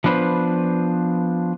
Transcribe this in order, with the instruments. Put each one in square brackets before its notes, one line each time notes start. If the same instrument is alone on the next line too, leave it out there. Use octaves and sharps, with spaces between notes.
[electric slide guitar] F3 B3 D4 B4 C5